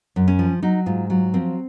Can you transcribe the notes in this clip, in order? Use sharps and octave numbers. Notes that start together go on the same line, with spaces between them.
F#2
C#4
F3
F#3 D#4
G#2 F4
F#3 F4
F3 C4